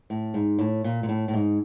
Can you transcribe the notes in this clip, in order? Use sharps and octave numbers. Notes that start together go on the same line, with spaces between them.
A2
G#2
A2
A#2
A#2
A2
A2
G#2